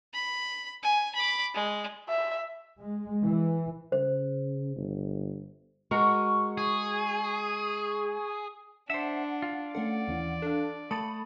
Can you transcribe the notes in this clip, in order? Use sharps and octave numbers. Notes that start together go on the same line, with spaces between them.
B5
G#5
B5 D6
G#3
E5
G#3
E3
C#3 C5
G1
G#3 F#4 A#4 C#6
G#4
D4 C5 E5 F#5
F4
A3 C#4 A4 D5 F#5
D#2 E3 C#4
D4 A4 F5
A3 A4 B5 D#6